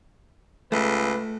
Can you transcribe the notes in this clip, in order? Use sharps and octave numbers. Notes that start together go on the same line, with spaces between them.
C#2 A3 B4